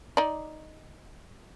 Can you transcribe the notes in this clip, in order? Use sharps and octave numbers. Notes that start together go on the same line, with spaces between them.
D#4 D5